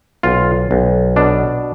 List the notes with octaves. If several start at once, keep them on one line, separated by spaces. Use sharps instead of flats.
B1 F4
B1
B2 D4